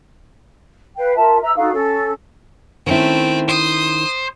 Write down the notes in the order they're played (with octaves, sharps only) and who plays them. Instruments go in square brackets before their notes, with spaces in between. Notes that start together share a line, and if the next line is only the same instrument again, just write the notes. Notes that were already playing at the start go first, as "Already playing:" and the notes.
[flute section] B4 F5 G5
F4 A#4 E5 A5
B4 E5 A#5 E6
D#4 F#4 A4 F5
C#4 A4
[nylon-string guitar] D#3 C#4 E4 [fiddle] A3 C4
[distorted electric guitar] C5 [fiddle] D#6